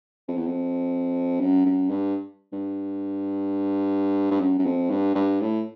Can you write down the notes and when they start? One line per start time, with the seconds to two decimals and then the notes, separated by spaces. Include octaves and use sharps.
0.28 F2
0.37 E2
0.47 F2
1.40 F#2
1.66 F#2
1.90 G2
2.53 G2
4.31 G2
4.41 F#2
4.59 F#2
4.66 F2
4.90 G2
5.15 G2
5.41 A2